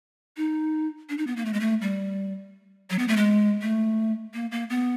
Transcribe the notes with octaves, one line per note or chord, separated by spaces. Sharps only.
D#4
D4
D#4
B3
A#3
A3
G#3
A3
G3
F#3
B3
A3
G#3
A3
A#3
A#3
B3